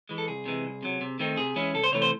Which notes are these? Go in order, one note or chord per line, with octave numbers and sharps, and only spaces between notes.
E3 G#3
A4
C2 G#4
C3 E3 G#3
C2
C3 F#3
C3
D#3 A3 C4 D#4
C3 G#4
E3 G#3 C#4 E4
C2 A4
C5
C3 E3 A3 C#5
C5